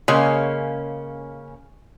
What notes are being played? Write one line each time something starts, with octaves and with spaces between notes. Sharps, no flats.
C#3 G#3 A#3 C#4